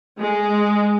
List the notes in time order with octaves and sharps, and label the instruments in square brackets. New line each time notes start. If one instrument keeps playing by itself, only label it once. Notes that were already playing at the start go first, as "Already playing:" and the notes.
[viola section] G#3